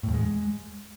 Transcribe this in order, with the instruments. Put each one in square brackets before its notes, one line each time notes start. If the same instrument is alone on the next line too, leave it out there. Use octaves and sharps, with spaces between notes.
[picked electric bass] A2
E2
G#3